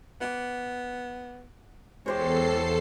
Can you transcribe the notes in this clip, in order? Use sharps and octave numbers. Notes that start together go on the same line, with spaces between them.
B3 F#5 D6
E2 G#3 G4 A4 C5 C#5 C7